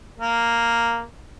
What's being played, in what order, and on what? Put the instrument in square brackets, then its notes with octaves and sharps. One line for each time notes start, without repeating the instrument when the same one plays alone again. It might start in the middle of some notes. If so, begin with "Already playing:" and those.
[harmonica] A#3